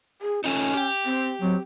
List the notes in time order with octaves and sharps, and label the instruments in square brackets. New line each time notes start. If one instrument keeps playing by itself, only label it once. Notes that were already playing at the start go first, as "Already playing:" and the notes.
[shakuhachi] G#4
[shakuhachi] C#4 [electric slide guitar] D#4 F4 A4
[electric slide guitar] G4 G5
[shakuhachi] C4
[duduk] F#3 [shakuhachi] C4